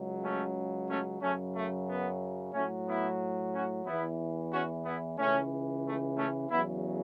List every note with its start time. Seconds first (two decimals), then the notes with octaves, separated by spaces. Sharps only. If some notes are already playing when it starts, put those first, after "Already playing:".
Already playing: C#2 C#3 F#3
0.23 A3 C#4
0.89 A3 C#4
1.22 F#2 C#3 F#3 A3 C#4
1.55 A3
1.88 B3
2.54 A2 F#3 A3 C#4
2.87 B3 E4
3.53 C#4 F#4
3.86 E2 E3 B3 E4
4.52 C#4 F#4
4.85 B3 E4
5.19 C#2 C#3 E3 A3 C#4
5.85 A3
6.17 A3 C#4
6.50 E2 C#3 F#3 B3 E4